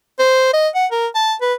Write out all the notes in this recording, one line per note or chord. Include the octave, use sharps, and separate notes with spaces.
C5
D#5
F#5
A#4
A5
B4